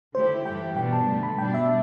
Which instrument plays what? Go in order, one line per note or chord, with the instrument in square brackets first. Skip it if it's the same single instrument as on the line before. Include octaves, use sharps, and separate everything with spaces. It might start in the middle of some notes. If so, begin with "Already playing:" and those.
[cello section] D3 A3 E4 G4 [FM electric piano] C5
[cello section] G2 E3 A3 E4 G4 [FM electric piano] G5
[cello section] B2 B3 D4 [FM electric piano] G5
[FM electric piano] A5
[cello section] G2 D3 A3
[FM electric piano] B5
[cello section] B2 G3 D4 [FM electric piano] G5
[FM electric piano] E5